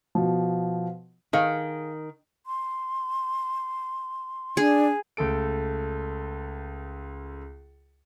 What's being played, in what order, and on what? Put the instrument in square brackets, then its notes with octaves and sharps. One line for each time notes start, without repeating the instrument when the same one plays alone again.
[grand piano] B2 F3
[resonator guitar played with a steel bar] D#3 [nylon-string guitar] G#4 F5
[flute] C6
[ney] D4 [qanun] G#4
[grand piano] C#2 A3 A4 D7